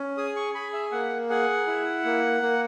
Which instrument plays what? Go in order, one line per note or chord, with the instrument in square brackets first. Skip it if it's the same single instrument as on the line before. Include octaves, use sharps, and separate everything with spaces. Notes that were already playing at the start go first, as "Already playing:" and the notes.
Already playing: [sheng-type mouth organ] C#4
G#4 D#6
C#6
G#4 B5
E5
A#3 F#5
G#4 F#5
E4
A#3
A#3